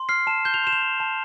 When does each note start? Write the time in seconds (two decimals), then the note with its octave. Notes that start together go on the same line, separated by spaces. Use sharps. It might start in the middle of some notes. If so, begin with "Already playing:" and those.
Already playing: C6
0.09 F6 C7
0.27 A5 E7
0.45 G6 G7
0.54 F7
0.64 C6 E7
0.72 F7
0.82 G6
1.00 A5